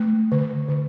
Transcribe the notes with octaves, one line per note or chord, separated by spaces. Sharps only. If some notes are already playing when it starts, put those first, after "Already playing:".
Already playing: A3
D3
D3